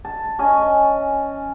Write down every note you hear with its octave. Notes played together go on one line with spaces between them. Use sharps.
A5
C#4 D#5 G#5